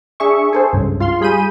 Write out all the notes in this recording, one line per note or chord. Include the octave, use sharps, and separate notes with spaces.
D4 G#4 E5 C#6
G#4 A4 C5
C#2 G2 C#3
F4 F5 C6
G3 G#4 B5 G6 D#7